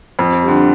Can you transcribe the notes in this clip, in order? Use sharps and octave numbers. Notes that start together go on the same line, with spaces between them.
F2
D3 G3